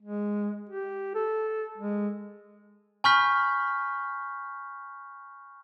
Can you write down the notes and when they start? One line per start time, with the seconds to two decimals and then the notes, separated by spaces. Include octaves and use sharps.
0.02 G#3
0.69 G4
1.15 A4
1.77 G#3
3.04 G#5 B5 C#6 F6 G6 B6